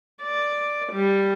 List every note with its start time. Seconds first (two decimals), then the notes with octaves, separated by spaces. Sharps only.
0.22 D5
0.92 G3